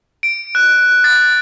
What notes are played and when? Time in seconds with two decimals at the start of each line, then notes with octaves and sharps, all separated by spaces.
0.23 D7
0.55 F#6
1.04 A6